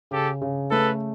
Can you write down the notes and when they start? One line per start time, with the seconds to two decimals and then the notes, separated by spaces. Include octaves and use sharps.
0.11 C#3 G4 A4
0.42 C#3
0.71 A3 A4 B4